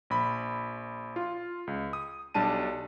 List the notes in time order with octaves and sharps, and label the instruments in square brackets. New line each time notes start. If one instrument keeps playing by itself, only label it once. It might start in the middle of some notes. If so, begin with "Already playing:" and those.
[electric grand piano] A#1 B5
F4
C#2
D#6
B1 G3 D4 A5 D#7